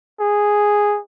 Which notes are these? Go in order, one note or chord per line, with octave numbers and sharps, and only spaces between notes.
G#4